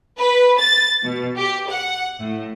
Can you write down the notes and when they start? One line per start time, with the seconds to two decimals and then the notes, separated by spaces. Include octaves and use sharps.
0.19 B4
0.59 A6
1.04 B2
1.37 G4
1.69 F#5
2.19 A2